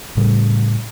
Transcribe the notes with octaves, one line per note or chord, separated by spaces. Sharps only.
A2 C#3 G3